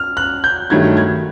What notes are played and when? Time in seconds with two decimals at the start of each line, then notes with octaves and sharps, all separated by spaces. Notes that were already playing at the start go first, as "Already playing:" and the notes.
Already playing: F6
0.17 F#6
0.44 G6
0.70 G2 D#3 F#3 A3 G#6
0.97 G#6